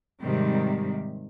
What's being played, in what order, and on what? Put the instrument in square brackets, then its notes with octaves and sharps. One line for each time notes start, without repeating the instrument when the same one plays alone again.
[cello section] G#2 C3 D#3 G3